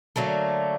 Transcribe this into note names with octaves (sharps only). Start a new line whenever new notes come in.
D3 F#3 A3 A#3